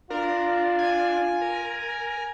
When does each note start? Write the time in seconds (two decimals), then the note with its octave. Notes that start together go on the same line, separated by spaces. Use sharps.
0.10 D4 F4 A#4
0.79 G#5
1.41 A#4